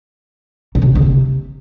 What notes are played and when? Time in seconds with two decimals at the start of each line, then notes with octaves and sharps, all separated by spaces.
0.75 A#2
0.82 C3
0.88 G3
0.95 D#3
1.02 C3